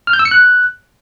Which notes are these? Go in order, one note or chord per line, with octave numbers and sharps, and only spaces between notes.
F6
G6
E6
C#7
F#6